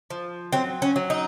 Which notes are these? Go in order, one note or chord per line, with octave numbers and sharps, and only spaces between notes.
F3
F#3 C4
C#4
F#3
D#4